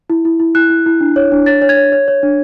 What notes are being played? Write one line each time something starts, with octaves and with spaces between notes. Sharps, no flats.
E4
E4
E4
E4 F#6
E4
E4
D4
C#5
D4
C#5 A6
C#5
G#6
C#5
C#5
C#5
D4